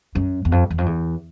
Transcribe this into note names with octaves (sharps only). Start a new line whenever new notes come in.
F#2
E2
F2
E2
F2
E2